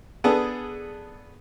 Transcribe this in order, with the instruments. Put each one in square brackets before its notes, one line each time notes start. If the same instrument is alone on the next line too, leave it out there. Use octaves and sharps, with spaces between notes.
[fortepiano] B3 D4 G#4 A4